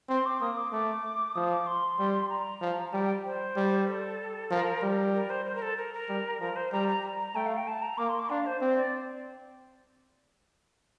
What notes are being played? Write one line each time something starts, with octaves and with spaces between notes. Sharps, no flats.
C4 C6
D6
A#3 D#6
D6
A3 D6
F3 D#6
D6
C6
G3
A#5
F3
G3 G5
G5
C5
G3
A4
F3 A#4
G3
A#4
C5
C5
A#4
A4
A#4
A#4
G3
F3 A#4
C5
G3 A#5
A#5
A#5
A3 G5
F5
G5
A5
A#5
A#3 D6
C6
D6
D4 F5
C5
C4 C5
D5